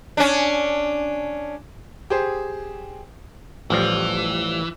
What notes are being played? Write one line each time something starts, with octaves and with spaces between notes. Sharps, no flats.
C#4 D4
G4 G#4 C5
A1 E3 F3 G3